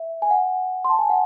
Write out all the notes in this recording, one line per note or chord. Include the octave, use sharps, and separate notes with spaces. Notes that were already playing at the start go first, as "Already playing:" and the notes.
Already playing: E5
G#5
F#5
C6
A5
G#5
F#5